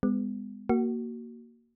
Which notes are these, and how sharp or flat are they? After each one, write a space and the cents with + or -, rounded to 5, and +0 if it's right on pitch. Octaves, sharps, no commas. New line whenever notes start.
G#3 -25 B3 +25
A#3 +0 F#4 +20